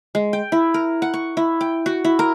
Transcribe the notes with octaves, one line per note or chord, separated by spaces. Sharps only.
G#3
G5
E4
A#4
F#5
C#6
E4
G5
F#4
E4
A#4